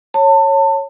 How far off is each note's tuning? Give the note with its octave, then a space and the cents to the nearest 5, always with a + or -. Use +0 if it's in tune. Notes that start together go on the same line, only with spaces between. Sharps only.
C#5 -10 A5 +30